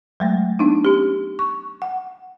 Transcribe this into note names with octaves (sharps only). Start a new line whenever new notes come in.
F#3 G#3 A3
B3 D4 D#4
C#4 G4
C#6
F#5